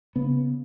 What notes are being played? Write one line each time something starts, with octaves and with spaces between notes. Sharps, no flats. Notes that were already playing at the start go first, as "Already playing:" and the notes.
C#3 B3